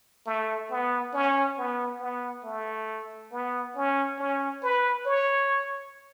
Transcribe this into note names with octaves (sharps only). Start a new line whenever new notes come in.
A3
B3
C#4
B3
B3
A3
B3
C#4
C#4
B4
C#5